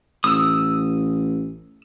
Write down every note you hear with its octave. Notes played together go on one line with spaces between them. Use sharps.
A1 D#6 E6